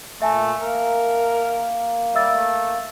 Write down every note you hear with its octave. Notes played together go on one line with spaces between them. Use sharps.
A#2 A3 E5 G#5 A5
A#3 A#4
G3 E5 E6 A6
A3